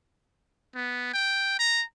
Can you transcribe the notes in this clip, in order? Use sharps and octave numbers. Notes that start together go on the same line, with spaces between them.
B3
G5
A#5